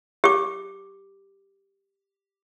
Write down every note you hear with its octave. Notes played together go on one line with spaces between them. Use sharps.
G4 D6